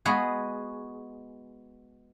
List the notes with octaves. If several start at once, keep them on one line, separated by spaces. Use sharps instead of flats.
G#3 B3 F#4 G#4